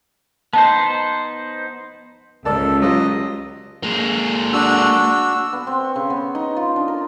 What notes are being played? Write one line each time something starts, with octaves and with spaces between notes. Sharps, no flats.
B3 D#4 C5 A5
C#2 A4 A#4 D5 A5
F#3 G3 F4 D#5
G#3 A#3
D4 F#4 E6
B3
C4
C#6
C#3
B3
D#4
F4
D4
A#4